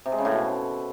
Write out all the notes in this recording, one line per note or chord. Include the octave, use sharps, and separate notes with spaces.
C3
G#3
C#3
A2
B2